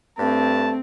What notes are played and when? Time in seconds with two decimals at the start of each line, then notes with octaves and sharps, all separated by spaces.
0.19 G2 A3 C4 A5